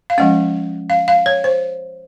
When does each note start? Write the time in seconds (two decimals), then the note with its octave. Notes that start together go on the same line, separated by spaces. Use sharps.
0.10 F5
0.18 F3 G#3 C#4 F#5
0.90 F5
1.08 F5
1.26 C#5
1.44 C5